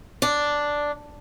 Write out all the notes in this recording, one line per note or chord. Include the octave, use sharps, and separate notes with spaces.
D4